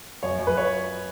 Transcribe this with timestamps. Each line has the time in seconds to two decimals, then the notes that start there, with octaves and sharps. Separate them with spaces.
0.23 F#2 C#5
0.39 F#2
0.47 B4
0.57 C#5